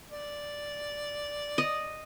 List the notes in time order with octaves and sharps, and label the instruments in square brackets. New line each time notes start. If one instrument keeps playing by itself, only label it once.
[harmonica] D5
[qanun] D#5